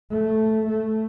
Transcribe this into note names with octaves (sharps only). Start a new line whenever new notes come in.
A3
A3